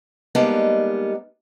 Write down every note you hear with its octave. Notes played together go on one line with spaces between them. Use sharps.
G3 G#3 A#3 B3 D4 D#4